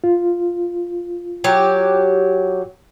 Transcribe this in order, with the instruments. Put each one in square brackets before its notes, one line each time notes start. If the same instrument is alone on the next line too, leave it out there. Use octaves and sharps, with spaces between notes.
[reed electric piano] F4
[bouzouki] F#3 G4